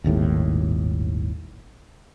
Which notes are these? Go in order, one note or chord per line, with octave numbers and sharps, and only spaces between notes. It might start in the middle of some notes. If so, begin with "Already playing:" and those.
D#1 G#1 D#2 A2